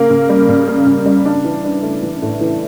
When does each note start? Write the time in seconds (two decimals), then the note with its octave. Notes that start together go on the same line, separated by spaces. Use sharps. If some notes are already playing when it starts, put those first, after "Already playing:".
Already playing: C#3 A#3
0.10 C#3
0.29 G3
0.49 C#3
0.68 A#3
0.86 C#3
1.06 G3
1.25 D4
1.45 E3
1.65 D4
1.83 A3
2.02 E3
2.22 A2
2.41 E3